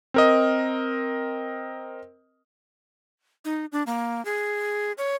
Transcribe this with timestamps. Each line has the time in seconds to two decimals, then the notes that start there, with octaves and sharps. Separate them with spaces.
0.14 C4 A#4 D#5
3.45 D#4
3.72 D4
3.87 A#3
4.25 G#4
4.98 C#5